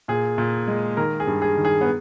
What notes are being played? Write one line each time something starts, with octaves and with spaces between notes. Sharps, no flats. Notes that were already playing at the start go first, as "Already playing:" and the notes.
A#2 G#4
A#2
G#3
D#3 A#4
G#4
G2
G#4
D#3
G#4
B3